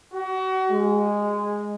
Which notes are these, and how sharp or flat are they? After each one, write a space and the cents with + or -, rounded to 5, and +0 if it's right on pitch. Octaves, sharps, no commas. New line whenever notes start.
F#4 +30
G#3 -10